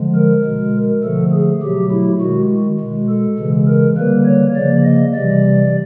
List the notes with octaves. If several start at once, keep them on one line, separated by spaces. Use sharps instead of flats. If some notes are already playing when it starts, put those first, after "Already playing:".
Already playing: D3 F3 G#3
A#4
B2 G#3
D3 F3 A3 A4
G#4
B2 F#3 A3 G4
E4
D#3 G#3 F#4
B2 G#3
A4
C#3 E3 G#3
A#4
D3 G3 A#3 B4
C#5
C#3 F3 A#3 D5
D#5
C3 E3 G3 D5